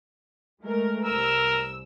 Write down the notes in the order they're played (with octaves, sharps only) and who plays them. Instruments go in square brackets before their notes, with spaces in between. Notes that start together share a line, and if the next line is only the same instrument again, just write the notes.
[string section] G#3 A3 A#4
[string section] C2 E6 [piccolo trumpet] A#4